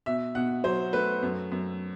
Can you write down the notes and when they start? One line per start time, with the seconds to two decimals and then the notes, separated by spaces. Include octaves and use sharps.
0.06 B2 E5
0.35 B2 F#5
0.64 F#3 C5
0.93 A3 B4
1.22 F#2
1.52 F#2